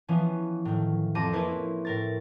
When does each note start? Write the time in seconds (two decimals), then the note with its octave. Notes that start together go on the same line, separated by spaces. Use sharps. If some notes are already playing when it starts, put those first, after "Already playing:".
0.08 E3 F3 B3 C#4
0.65 A2 D#3
1.15 F2 C4 A4 A#5 D6 D#7
1.33 A#3 C#4 E4 B4 C5
1.85 A2 A#4 A6